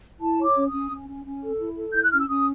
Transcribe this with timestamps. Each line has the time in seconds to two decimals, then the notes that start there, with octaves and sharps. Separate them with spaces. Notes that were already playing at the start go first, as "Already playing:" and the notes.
0.20 E4 A5
0.38 C#5
0.44 D6
0.55 C#4
0.67 D#6
0.72 C#4
0.91 C#4
1.08 C#4
1.25 C#4
1.43 A4
1.59 E4
1.76 A4
1.94 E4 G6
2.03 F#6
2.11 C#4 F6
2.20 E6
2.28 C#4 D#6